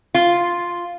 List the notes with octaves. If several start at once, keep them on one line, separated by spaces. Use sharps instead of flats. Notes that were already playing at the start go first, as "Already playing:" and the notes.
F4